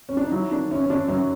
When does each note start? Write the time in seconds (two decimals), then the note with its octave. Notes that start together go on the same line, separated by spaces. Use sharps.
0.09 C#4
0.17 D4
0.25 D#4
0.31 F#3 E4
0.51 D#3 D4
0.71 F#2 C#4
0.85 C#4
0.89 F#2 D4
1.08 F#3 C#4